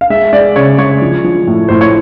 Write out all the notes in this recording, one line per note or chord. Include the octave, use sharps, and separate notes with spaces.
F5
G#3 E5
G#3 D5
C#3 C#5
G#3 C#5
F3
F3
A2
A2 C5
C#5